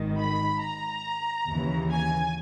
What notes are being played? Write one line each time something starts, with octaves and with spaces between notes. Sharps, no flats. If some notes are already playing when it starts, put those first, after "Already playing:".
Already playing: G#1 G#2 D#3
B5
A#5
D#2 C#3 E3
G#5